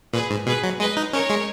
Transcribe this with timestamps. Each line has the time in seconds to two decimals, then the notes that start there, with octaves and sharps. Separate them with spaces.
0.13 A#2 G#4 B4
0.30 G#2
0.47 B2 G#4 B4
0.64 F#3
0.80 G#3 B4 D#5
0.97 D#4
1.13 C#4 A#4 C#5
1.29 G#3